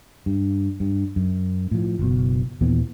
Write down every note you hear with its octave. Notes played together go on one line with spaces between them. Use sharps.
G2
G2
F#2
A2 F3
F#1 B2
D#2 A#2 E3 B3